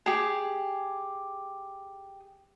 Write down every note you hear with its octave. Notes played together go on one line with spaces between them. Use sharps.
G4 G#4